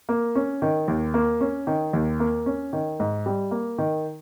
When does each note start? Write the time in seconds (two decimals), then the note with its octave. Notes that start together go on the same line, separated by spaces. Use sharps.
0.09 A#3
0.35 C#4
0.62 D#3
0.88 D#2
1.14 A#3
1.41 C#4
1.67 D#3
1.93 D#2
2.20 A#3
2.46 C#4
2.73 D#3
3.00 G#2
3.26 G3
3.51 A#3
3.78 D#3